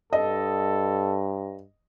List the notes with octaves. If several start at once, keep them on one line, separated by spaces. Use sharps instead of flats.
G2 A4 D#5